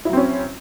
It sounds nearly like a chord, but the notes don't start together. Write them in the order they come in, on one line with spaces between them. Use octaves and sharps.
E4 F#3 C4 C#4